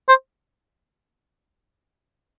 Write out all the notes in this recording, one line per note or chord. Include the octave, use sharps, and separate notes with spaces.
C5